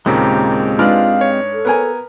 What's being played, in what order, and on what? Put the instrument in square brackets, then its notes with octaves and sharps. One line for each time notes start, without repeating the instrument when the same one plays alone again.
[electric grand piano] D#2 A#2 C#3 [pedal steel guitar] G#3 C4 G4 [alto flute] A#5
[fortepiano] G#2 D4 B4 [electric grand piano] F4 F6 [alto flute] F5
[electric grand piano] C#5
[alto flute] A4
[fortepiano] B3 A#4 G#5